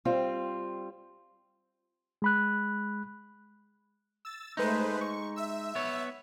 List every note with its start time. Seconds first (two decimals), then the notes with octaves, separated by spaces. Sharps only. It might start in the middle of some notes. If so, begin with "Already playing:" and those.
0.05 G3 C4 F4
2.22 G#3 B5 F#6
4.25 E6 A6
4.57 G#3 A3 D#4 B4 C5
5.01 C#6
5.36 E5 E6
5.75 B3 C#5